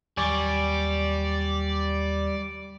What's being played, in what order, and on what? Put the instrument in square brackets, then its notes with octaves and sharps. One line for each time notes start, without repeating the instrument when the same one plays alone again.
[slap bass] D#2 F#3 [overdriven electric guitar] G3 [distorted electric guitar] D5 [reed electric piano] G#5 C#6 D6